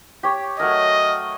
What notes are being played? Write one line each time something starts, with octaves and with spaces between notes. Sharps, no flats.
G4 C#5
F#3 A3 A#4 D#5